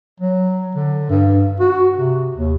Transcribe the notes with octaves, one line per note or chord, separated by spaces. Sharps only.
F#3
D3
G2
F#4
C3
D#2